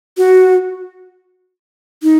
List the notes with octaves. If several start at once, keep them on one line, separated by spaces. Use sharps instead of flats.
F#4
D#4